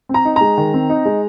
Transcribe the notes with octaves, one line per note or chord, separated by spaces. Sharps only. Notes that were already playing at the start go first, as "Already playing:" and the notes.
C4
A#5
D#4
G#3 A#5
D#3
C4
D#4
G#3